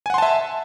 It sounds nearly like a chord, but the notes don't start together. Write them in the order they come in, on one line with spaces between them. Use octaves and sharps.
G#5 F#5 C6 A5 E5